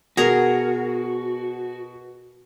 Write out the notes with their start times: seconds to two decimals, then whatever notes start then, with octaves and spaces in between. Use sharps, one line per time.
0.17 B2 F#4 G#4 A#4